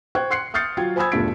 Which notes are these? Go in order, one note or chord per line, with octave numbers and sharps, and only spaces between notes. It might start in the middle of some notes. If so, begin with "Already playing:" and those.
C5 G5 C#6 F#6 G#6
C6 F#6 C7 C#7
D#6 F6 G6 A6 C7 C#7
F#3 F4 G5 G#6
C5 G#5 B5 D#6 E6 G#6
E1 G2 A3 F4 B6 D7